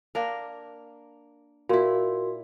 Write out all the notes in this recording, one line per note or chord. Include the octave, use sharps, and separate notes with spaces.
A#3 D4 A#4
A#2 E4 F#4 A#4 C6